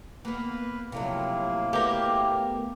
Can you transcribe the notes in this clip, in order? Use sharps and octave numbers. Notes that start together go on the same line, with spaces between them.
A#3 B3 B4
A2 C3 F3 F#3 A#3
A3 B3 F#4 G4 A#4